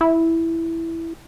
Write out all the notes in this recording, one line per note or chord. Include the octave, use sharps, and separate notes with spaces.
E4